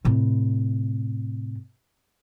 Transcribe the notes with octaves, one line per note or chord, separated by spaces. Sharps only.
A2 C3